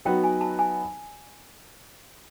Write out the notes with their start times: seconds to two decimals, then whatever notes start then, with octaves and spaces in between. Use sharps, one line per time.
0.05 F#3 B3 D#4 F#4 B4 G5
0.24 G#5
0.41 A5
0.59 G#5